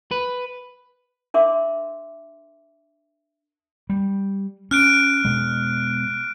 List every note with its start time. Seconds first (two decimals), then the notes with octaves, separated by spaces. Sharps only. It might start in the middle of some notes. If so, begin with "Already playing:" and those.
0.11 B4
1.34 D4 A#4 E5 C6 D6
3.90 G3
4.71 C#4 F6 F#6 D7
5.25 B2 G#3